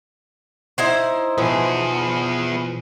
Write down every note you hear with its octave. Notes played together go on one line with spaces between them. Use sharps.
D#4 E4 C5
B2 E3 F3 B3 G#4